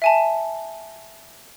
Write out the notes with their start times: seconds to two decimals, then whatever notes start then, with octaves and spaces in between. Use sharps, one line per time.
0.02 E5 G#5 A5